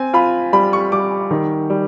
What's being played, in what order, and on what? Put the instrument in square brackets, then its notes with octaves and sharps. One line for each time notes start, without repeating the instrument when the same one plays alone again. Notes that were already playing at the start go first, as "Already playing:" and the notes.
Already playing: [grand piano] C4 [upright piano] G#5
[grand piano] F4 [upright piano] B5
[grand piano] G3 [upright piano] B5
[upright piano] C#6
[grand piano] G3 [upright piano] D6
[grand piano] D#3
G3